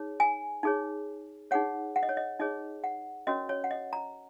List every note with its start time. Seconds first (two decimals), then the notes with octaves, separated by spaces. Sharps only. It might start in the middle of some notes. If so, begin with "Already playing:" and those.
Already playing: D#4 G#4 C#5
0.20 G#5
0.63 D#4 G#4 C#5
1.51 D#4 G#4 C#5 F#5
1.96 F#5
2.03 D#5
2.09 C#5
2.17 D#5
2.39 D#4 G#4 C#5 D#5
2.84 F#5
3.27 C#4 F#4 A#4 C#5 D#5
3.49 C#5
3.64 F#5
3.71 D#5
3.93 A#5